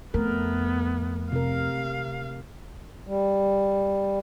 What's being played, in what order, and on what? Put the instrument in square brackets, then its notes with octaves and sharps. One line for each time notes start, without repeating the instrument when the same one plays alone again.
[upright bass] F2 [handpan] A3 A#4 [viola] B3
[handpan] C3 A#4 [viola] F5
[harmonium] G3